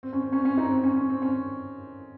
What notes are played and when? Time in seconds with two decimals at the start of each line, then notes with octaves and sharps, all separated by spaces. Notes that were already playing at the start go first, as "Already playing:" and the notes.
0.03 C4
0.13 C#4
0.22 C4
0.32 C#4
0.39 C4
0.45 C#4
0.57 C4 D#4
0.71 C4
0.83 C#4
0.96 C#4
1.10 C4
1.22 C#4